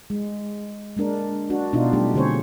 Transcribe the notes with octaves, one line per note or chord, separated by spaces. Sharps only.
G#3
G#3 A#3 D4 A#4
D4 F#4
B2 D4 D#4 F4
F#3 G3 A3 D4 G4
D3 C4 G#4 C5 C#5